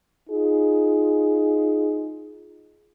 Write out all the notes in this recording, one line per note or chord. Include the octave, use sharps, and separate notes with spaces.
D#4 F4 G#4